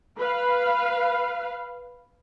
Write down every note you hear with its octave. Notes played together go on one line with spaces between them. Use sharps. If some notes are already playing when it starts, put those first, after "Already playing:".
B4 F5